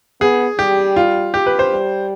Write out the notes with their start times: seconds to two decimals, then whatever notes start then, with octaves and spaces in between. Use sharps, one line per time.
0.21 B3 G#4
0.58 G3 G4
0.96 F4
1.34 G4
1.46 B4
1.59 C5
1.72 G3